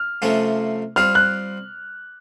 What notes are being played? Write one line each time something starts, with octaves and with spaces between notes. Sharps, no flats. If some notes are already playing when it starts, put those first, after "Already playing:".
Already playing: F6
C3 F3 A3 C#4 F4
G3 C4 F4 F6
F#6